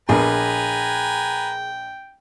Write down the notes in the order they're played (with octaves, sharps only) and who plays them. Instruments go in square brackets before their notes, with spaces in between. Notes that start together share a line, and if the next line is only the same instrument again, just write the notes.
[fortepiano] A#1 A#3 B3 [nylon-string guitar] G#4 [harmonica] B4 G#5 A#5 [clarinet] G5